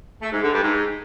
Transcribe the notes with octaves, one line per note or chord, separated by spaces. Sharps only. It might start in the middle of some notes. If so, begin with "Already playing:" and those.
A3
G#2
D3
G2
G#2